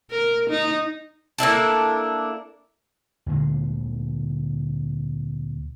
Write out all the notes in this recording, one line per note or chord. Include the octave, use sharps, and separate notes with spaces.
A#4
D#4
A#3 D4 E4 A4
D2 A#2 D3 G#3